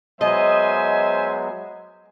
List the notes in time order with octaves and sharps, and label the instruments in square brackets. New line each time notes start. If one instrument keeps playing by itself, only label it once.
[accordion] F#3 G#3 B3 [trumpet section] C5 E5 G#5 [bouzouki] D#5